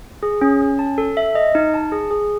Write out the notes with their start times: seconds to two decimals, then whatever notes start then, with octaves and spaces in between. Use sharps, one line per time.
0.23 G#4
0.41 C#4
0.61 C#4
0.79 A5
0.98 A4
1.17 E5
1.35 D#5
1.55 D#4
1.74 A5
1.92 G#4
2.11 G#4